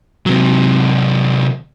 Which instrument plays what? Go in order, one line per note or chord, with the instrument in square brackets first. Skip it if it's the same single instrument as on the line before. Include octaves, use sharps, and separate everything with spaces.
[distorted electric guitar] C3 F#3